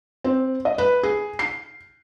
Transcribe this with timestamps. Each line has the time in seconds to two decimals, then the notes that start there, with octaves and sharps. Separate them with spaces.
0.24 C4
0.65 D#5
0.78 B4
1.03 G#4
1.39 C7